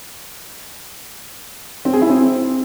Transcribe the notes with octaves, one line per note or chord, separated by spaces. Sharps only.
C4
G#4
E4
C4